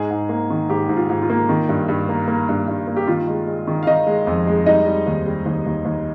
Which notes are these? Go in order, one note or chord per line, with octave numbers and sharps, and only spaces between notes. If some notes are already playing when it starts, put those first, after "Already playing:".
Already playing: G#2 G#3 G#4
G#2
A#3
D#3
G#2 G4
G#2
F4
G#2
F4
A#3
D#3
G2
G2
A#3
A#3
G2
G2
A#3
G4
D#3 F4
G#3
G#3
D#3
F5
D#3 D#4 D#5
G#3
F2
G#3
G3 D#4 D#5
G3
D#2
G3
D#2
D#2
D#2